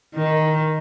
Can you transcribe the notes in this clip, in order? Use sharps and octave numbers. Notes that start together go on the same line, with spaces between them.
D#3